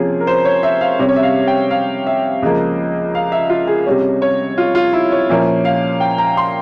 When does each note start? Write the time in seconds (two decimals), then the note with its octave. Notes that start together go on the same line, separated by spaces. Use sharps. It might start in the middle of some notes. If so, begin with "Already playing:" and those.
Already playing: C3 F3 A#3 C#4 F4 G#4
0.20 A#4
0.27 C5
0.45 C#5
0.63 E5
0.81 F5
0.99 C3 G3 C#4
1.09 C#5
1.16 E5
1.23 F5
1.47 G5
1.71 F5
2.07 E5
2.42 C#2 C#3 F3 A#3
3.15 F5
3.32 E5
3.50 F4
3.67 G#4
3.86 C3 G3 C#4
4.22 C#5
4.58 F4
4.75 F4
4.93 E4
5.12 C#5
5.30 A#2 F3 A#3 C#4 E5
5.65 F5
6.00 G5
6.18 A#5
6.37 C6